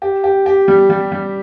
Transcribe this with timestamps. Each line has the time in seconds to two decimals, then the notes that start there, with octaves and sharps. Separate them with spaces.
0.02 G4
0.24 G4
0.46 G4
0.68 G3
0.90 G3
1.12 G3